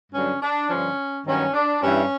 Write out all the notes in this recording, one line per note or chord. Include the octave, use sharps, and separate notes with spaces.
G2 D3 F#3 C#4
D4
G2 D3 F3 C#4
G2 D#3 F#3 C#4
D4
G2 E3 C#4